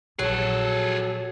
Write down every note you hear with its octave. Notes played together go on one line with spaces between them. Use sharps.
A#1 F#3 G#4 A4